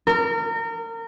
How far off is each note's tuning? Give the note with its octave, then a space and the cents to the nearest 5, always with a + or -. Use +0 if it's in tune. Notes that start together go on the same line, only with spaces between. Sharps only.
A#4 -30